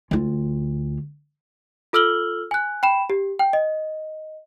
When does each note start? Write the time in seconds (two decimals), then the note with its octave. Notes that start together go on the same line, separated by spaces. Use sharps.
0.11 D2 F4
1.93 F4 A4 E6 F6 F#7 G7
2.51 G#5 F#6
2.83 G5 B5 E7
3.10 G4
3.39 G5
3.53 D#5